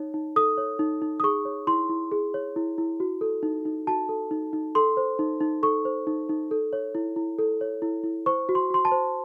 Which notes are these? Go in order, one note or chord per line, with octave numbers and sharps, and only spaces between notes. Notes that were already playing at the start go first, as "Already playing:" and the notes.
Already playing: D#4 C#5
D#4
A4 D#6
C#5
D#4
D#4
D#6
G#4 C#6
C#5
E4 C6
E4
G#4
C#5
E4
E4
F#4
A4
D#4
D#4
F#4 A5
A4
D#4
D#4
A4 C6
C5
D#4
D#4
A4 C#6
C5
D#4
D#4
A4
C#5
E4
E4
A4
C#5
E4
E4
C5 C#6
F#4
C6
F#4 C6
A5
C5